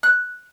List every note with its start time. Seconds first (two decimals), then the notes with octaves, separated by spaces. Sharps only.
0.03 F#6